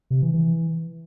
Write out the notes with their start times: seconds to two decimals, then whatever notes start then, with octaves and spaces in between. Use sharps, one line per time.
0.10 C3
0.22 E3
0.34 E3